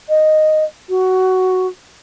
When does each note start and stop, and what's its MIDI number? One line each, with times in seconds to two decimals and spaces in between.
0.09 0.64 75
0.89 1.67 66